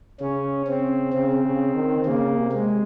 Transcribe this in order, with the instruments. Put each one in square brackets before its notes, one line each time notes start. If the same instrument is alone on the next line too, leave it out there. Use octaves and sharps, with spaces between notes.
[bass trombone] C#3 [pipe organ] C#4
[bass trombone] C#3 [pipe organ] C4
[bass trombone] C#3 [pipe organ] C4
[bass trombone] C#3
D#3
[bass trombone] C#3 [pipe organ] A#3
[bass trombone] C3
[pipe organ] G#3